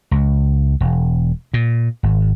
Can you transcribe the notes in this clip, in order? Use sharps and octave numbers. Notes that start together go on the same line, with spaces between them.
C#2
E1
A#2
G#1